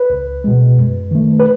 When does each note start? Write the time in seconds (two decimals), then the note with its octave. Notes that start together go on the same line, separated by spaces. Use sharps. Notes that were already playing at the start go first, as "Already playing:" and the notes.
Already playing: B4
0.10 C#2
0.44 B2 G#3
0.77 F#2
1.11 D#3 A3
1.40 B4